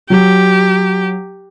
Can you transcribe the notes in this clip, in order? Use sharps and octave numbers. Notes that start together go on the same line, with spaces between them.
F#3 G4